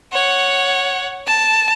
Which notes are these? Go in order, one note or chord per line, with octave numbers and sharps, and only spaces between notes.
C#5 F#5
A5